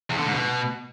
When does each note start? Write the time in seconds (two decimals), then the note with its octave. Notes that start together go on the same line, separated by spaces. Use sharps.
0.10 E2
0.18 D3
0.26 G#2
0.34 B2